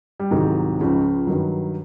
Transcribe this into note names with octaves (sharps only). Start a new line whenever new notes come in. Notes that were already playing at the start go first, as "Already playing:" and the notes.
G3
C2 G#2 C3 D#3 F#3 G#3
C#2 C#3 F3
G2 D#3 F#3